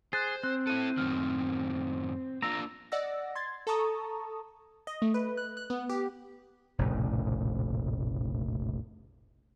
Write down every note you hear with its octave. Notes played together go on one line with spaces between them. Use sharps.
G#4 C5 F#6 A6
C4 F#6
E4 A4 F#6 D#7
F#2 A2 D#3 F6
A#3 D4 F4 A#5 E6
D5 D#5 F#5 E6 A#6
C6 G#6 A6
A4 A5 A#5 C#6 D#6
D#5
A3
B4
F#6
F#6
B3
G4
F1 A#1 A2 C#3